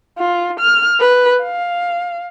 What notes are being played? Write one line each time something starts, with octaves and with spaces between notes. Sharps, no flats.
F4
F6
B4
F5